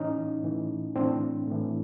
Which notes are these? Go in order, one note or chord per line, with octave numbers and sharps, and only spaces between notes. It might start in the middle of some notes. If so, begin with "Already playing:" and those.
Already playing: A2 E3 C#4 D#4
A2 E3
A2 E3 C4 D4
A2 E3